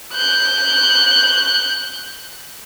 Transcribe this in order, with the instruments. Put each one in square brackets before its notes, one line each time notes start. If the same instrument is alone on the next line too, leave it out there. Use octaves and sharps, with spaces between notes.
[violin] F#6 G6